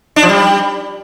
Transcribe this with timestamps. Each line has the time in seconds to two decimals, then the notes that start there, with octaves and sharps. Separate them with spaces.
0.16 D4
0.23 F3
0.29 G3